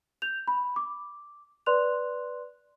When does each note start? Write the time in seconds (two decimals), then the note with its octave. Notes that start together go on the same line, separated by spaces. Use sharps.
0.22 G6 F7
0.47 B5
0.76 D6
1.66 B4 D5 C6 F#6 F7